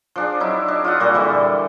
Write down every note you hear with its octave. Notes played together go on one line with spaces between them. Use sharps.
F3 D4 G#4
F#3 D#4 E4
D4
F4 D#5 F#5
A#2 G3 F#4 A4
D3 E3 G3